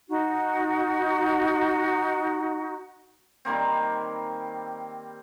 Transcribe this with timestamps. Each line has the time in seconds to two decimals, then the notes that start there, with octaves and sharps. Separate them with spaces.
0.09 D#4 F#4
3.45 D#3 G3 A#3 C4